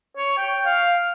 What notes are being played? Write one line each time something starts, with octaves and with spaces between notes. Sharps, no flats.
C#5
G5
F5